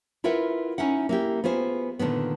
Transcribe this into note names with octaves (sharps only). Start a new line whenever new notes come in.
E4 F4 A#4 B4 E5 F#5
C#4 D#4 E4 F#5
A#3 E4 G4
B3 F4 G#4 C5
A#2 D3 D#3 B3